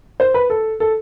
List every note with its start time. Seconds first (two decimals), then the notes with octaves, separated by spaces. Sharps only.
0.20 C5
0.34 B4
0.50 A4
0.80 A4